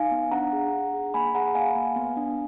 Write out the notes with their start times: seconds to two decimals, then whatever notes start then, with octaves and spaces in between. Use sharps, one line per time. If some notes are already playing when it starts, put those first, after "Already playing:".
Already playing: D#4 F5 G#5
0.11 B3
0.31 D4 F#5 A#5
0.53 G#4
0.73 D4
0.93 G#4
1.14 A#3 G#5 B5
1.35 G#4 F#5 A#5
1.55 A#3 F5 G#5
1.75 A#3
1.96 B3
2.17 D4